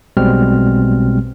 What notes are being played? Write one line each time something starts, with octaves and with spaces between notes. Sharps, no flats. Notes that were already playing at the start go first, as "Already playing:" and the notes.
B1 B2 G3 G#3 C4 F6